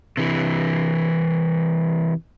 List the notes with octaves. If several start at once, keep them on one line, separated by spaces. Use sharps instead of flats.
C3 E3